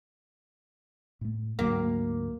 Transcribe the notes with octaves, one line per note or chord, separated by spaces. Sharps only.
A2 A3
D2 G#2 F#3 A#3